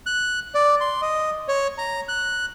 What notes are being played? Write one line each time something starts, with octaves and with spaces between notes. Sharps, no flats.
F#6
D5
C6
D#5
C#5
A#5
F#6